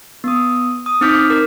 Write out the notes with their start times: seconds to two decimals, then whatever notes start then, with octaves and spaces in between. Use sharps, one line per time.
0.24 B3 D#6
0.86 D#6
1.01 C4 D#4 D6 F6 G6 B6
1.30 A#4